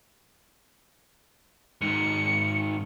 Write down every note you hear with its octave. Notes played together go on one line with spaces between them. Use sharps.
G#2 D#3 C#7